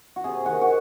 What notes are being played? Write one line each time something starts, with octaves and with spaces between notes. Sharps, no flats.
F#4
C3 G#4
D#3 F#4
F#4